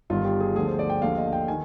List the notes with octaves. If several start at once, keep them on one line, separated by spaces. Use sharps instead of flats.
G1 G2 D#3 F4
G4
G#4
D2 D3 F3 G#4
C5
D5
G5
D#2 D3 F3 F5
D#5
G5
D#3 G#5